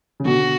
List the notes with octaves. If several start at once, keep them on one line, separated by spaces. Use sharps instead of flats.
C#3
B2 D3 F#4